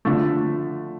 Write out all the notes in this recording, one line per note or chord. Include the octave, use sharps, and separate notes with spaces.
D3 F3 A3